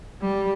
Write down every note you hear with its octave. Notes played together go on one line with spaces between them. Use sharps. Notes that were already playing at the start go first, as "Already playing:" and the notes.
G3